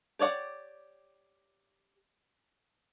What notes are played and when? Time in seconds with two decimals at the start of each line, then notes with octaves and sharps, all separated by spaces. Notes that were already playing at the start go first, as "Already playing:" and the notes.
0.19 G4 C#5 D5 F#5